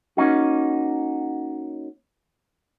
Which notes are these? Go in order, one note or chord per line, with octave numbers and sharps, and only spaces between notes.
A#3 C#4 D#4 F#4